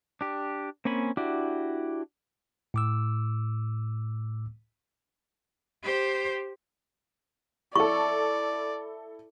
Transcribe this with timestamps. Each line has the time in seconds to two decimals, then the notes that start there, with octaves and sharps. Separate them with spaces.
0.21 D4 G4
0.85 A#3 C4 C#4 G#5 B5
1.17 D4 E4 F#4 G4 D5
2.74 A2 D6 E6
5.83 G4 C5
7.76 E4 A4 D5 C#6